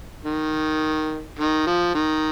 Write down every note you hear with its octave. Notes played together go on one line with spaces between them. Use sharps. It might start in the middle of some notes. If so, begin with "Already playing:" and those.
D#3
D#3
F3
D#3